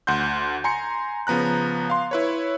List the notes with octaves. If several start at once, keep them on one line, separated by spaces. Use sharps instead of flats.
D2 F#5 C6 G6
G#5 A#5 C6 C#7
C#3 F3 B3 A#5 F#6
F5 C6
E4 B4 C#5